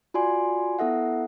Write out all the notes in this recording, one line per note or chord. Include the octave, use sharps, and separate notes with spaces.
F4 F#4 D5 G#5 C6
B3 E4 A4 E5 F#5